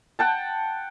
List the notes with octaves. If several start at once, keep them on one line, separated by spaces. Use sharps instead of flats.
F#5 G5 A5